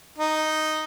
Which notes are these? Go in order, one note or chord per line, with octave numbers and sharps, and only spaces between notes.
D#4